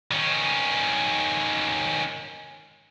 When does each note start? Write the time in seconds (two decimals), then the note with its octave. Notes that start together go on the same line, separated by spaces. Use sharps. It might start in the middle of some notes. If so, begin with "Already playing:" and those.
0.12 D#3 C#4